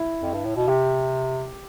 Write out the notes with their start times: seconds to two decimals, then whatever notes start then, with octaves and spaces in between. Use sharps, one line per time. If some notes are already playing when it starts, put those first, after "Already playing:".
Already playing: E4
0.22 F2
0.34 G2
0.45 A2
0.56 B2
0.68 C3 G4